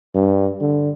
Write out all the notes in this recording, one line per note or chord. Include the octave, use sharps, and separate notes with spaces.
G2
D3